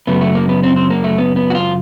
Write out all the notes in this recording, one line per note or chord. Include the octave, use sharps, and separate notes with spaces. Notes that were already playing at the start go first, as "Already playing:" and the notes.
F#2 C#3 F#3 A3 B3
A3
A#3
B3
C4
C4
A#3
A3
B3
B3
F#4
F4